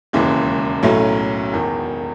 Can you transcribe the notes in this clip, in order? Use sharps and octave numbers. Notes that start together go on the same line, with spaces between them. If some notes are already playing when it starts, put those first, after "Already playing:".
E1 D#2 C#3 E3 G#3
B1 A2 F#3 A3 C#4
E1 E2 D#3